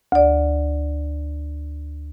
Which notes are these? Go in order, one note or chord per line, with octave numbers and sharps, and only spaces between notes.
D2 D5